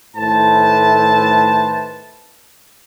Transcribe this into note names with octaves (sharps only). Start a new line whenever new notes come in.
A2 D#3 A3 B4 C5 A5